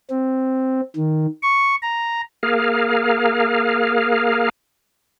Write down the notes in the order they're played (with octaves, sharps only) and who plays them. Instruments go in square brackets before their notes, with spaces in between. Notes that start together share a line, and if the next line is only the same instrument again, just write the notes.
[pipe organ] C4
D#3
C#6
A#5
[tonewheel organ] A#3 G#4 A#4 F5